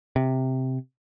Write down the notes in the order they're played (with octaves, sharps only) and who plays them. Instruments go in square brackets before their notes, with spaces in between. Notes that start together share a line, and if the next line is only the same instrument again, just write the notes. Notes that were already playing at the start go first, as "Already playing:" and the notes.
[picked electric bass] C3